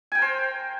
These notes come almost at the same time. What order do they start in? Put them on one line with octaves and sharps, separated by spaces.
G#5 G5 A#4 C5